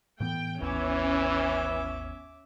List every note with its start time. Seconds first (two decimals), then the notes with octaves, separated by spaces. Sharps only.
0.20 A2 E3 B3 G5
0.62 G#1 D#2 E3 B3 C#4 E5 D6